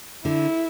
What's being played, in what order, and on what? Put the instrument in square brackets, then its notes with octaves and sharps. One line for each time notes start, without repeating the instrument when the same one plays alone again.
[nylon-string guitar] D3 [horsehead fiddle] E4